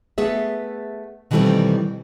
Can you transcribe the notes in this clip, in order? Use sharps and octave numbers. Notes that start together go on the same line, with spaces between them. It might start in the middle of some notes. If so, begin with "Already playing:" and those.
A3 B3 G#4 E5
B2 D#3 E3 G3 A3 C4